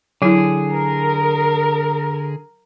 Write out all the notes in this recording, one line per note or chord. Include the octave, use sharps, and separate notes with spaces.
D3 F#3 E4 G#4
A#4